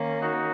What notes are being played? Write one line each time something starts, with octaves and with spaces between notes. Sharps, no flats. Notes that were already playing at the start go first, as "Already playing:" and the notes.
Already playing: D#3 A#3 C#4
D#4 F#4